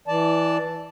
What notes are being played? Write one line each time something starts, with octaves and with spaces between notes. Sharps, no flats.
E3 D5 A5